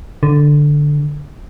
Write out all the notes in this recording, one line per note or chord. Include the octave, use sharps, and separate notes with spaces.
D3